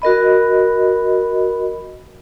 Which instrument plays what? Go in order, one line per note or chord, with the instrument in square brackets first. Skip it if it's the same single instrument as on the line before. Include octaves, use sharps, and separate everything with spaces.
[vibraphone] F#4 A#4 D#5 B5